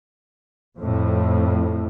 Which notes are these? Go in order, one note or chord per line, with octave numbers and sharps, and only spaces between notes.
F2 A2